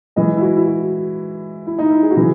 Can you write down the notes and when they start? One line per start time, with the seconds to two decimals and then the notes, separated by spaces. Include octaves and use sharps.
0.16 G#2 E3 D#5
0.37 E4
0.42 F#4
0.57 E4
0.66 F#4
1.67 E4
1.79 D#4
1.90 E4
2.03 G#4
2.11 F#4
2.16 C#3 E3 G#4